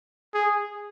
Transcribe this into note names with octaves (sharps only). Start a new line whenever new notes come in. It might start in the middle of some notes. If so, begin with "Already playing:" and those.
G#4